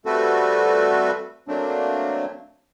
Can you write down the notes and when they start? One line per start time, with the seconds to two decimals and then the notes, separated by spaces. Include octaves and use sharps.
0.06 G3 A3 C4 F#4 A4 B4
1.48 F#3 A3 A#3 C4 D4